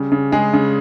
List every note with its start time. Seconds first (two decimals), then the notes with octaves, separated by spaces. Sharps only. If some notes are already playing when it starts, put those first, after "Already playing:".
Already playing: C#3 G3
0.12 C#3
0.32 C#3 G#3 G#4
0.53 C#3